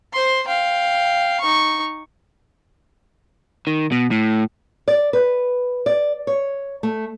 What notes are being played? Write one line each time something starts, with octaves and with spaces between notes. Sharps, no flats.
C5 C6
F5 G5
D#4 C#6
D#3
B2
A2
D5
B4
D5
C#5
A3